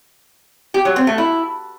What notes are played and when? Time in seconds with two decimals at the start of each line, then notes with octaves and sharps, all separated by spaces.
0.74 G4
0.85 F#3
0.96 C4
1.07 A3
1.18 E4